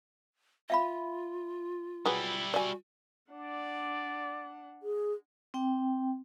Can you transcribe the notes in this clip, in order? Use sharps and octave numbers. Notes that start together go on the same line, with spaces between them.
F4 E5 F5 B5
F#3 G3 E4 G#4 B4
F#4 D5 G#5
D4 D5 F#5
G#4
C4 G5